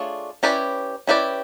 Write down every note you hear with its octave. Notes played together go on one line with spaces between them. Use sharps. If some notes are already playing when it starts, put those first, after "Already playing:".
Already playing: A3 D4 F4 G#4 C#5
C#4 E4 G4 B4 D5
C#4 E4 G4 B4 D5